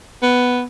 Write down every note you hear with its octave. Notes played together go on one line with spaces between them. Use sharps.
B3